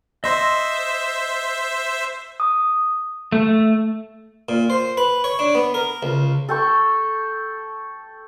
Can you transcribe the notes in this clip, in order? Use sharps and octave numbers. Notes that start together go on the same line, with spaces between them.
C5 D#5 E5 C6 E6
D#6
A3
A#2
C5
B4
C#5
D4
B3
A#4
C#2
A4 G5 C#6